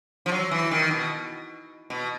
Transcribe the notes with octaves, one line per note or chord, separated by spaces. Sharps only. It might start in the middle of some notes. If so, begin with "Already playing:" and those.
F3
F#3
E3
D#3
B2
B2